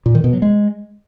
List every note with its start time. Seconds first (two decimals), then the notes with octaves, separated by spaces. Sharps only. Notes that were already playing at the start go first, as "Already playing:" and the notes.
0.06 A#2
0.15 D#3
0.24 B2
0.33 F#3
0.42 G#3